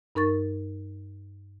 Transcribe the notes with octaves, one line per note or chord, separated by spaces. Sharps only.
G2 D#4 A#4 C#6 A6